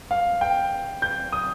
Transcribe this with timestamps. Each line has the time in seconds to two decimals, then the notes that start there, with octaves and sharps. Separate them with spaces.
0.11 F5
0.41 G5
1.02 G6
1.32 D#6